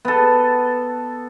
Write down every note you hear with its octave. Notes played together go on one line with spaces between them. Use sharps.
B3 A4